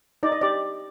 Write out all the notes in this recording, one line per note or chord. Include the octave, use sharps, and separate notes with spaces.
D#4 D5
D#5
G4 D5